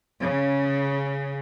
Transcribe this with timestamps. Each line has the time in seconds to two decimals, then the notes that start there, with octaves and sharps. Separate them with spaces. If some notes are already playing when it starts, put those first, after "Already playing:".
0.21 C#3